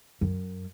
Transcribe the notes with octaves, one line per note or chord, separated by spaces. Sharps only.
F#2